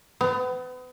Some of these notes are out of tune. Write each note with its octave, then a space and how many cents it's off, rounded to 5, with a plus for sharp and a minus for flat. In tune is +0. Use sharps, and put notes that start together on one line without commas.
B3 +35